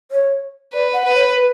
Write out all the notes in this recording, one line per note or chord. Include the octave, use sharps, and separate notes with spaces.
C#5
B4 D5
F#5
B4
C#5
B4